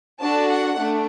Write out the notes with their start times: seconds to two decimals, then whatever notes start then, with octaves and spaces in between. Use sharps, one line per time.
0.20 D4 F#4 A4 A5
0.50 F#5
0.78 A3 D4